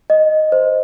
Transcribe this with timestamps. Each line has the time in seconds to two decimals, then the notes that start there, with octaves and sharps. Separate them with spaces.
0.10 D#5
0.52 C5